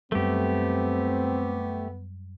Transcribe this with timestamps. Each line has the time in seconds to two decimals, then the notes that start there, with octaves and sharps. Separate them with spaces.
0.12 F#2 G3 A3 B3 C4 G4